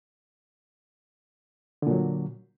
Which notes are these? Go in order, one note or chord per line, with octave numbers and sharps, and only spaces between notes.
A#2 D3 F#3